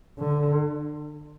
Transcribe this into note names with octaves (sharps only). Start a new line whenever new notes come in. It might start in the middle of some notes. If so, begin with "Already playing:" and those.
D3